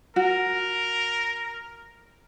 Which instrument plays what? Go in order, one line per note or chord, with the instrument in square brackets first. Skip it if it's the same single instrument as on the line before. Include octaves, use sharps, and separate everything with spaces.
[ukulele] F#4 [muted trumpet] A#4